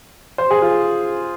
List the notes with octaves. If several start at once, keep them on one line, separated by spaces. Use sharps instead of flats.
C5
G#4
F4